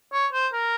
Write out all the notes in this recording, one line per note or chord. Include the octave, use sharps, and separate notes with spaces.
C#5
C5
A#4